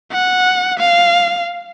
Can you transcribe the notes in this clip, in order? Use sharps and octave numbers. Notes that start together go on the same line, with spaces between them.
F#5
F5